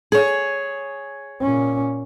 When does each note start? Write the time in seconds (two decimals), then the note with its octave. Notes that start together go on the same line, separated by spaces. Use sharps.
0.12 G#4 C#5
1.41 A#2 C#4